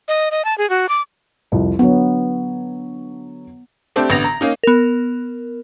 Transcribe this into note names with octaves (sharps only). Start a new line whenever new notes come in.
D#5
D#5
A5
G#4
F#4
D6
C2 F2
D3 F#3 B3 C#5
A3 C4 D4 G4
A1 D3 B3 A#6 F7
A#5
A#3 C#4 D#4
B3 A#4